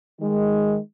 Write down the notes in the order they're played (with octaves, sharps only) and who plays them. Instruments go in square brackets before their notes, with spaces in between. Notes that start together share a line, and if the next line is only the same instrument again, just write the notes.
[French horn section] D#3 G#3